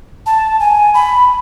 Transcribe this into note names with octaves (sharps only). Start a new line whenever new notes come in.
A5
G#5
B5